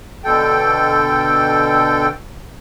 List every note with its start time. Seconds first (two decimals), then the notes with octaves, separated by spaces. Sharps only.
0.24 B2 D3 A4 G5